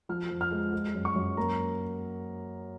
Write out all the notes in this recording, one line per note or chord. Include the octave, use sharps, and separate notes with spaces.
F3 F6
F2
F6
G#3
G#3
F#2
C#6
F#2
A#3 A#5